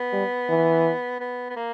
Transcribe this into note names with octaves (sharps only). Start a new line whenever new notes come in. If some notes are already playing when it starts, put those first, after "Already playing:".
Already playing: B3
G3
E3
B3
B3
A#3